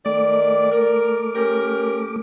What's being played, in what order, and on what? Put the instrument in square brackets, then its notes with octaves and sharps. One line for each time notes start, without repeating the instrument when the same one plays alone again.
[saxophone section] D#3 D5 [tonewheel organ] A3 D6
[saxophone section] A#4
C#4 G4 A#4